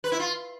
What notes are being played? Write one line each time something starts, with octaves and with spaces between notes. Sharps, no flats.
B4
E4
F4